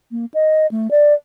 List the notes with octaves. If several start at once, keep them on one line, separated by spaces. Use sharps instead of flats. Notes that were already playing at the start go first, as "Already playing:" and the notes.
A#3
D#5
A3
D5